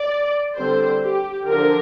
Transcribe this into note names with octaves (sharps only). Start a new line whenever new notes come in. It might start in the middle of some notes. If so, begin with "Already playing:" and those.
Already playing: D5
D3 G3 C4 C5
G4
D3 F3 D4 A#4